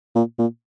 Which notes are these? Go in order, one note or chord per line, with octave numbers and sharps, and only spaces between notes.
A#2
A#2